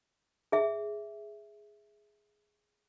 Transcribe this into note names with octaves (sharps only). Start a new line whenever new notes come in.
G#4 E5